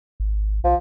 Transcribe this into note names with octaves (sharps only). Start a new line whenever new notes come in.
G#1
B1 F3